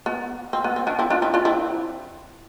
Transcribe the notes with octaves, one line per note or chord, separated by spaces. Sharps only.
B3
C4
B3
C4
B3 D4
C4 E4
D4 F4
C4 E4
D4 F4
C4 E4